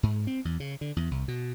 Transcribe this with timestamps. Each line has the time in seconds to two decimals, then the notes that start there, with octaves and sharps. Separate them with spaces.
0.03 G#2
0.27 C4
0.45 E2
0.60 C#3
0.81 D3
0.96 E2
1.11 C2
1.28 B2